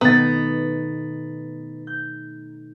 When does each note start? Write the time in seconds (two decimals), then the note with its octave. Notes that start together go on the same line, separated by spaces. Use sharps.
0.01 B2 D#3 A3 B3 A#5 A6
1.87 G6